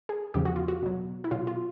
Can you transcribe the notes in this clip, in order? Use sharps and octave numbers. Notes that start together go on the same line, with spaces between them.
G#4
E2 C#3 F3 G4
F#4
F4
F#4
B2 F#3
E4
B2 F#3 F4
F4